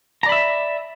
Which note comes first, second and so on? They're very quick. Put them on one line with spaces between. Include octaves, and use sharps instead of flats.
A#5 D5 B5 E5